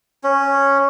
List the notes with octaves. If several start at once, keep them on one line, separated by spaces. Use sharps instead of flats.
C#4